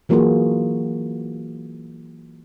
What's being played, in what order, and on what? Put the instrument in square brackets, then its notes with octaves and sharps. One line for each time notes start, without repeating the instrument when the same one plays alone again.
[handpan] E3 F#3 A#3 F4 F#4 G#4